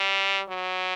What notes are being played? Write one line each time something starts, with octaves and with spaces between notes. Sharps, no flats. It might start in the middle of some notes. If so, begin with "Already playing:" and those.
Already playing: G3
F#3